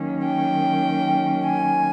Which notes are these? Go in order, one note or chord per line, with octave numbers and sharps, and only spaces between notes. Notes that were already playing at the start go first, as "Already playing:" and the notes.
Already playing: D#3 F#3 A#3 C#4
G5
G#5